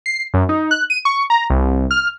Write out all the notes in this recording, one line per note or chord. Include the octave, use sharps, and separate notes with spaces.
C7
F#2
D#4
F#6
D#7
C#6
A#5
C2
F6